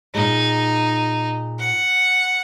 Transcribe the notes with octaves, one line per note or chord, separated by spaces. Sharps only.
A#2 G#3 D#4
F#5